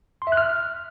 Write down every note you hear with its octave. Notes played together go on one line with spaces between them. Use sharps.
C6
E5
F#6
F6